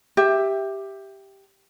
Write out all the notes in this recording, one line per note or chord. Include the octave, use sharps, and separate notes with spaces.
G4 E5